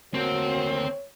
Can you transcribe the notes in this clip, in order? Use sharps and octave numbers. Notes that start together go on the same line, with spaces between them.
D2 A#3 C4 F#4 C#5